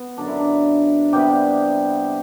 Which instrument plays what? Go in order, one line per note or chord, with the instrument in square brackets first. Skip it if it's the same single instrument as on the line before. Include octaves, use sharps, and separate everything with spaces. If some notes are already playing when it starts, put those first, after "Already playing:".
Already playing: [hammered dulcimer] B3
F#2 D3 F#3 D4
E4
D4
C3 G3 B3 G4